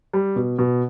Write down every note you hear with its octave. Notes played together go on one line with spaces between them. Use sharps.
G3
B2
B2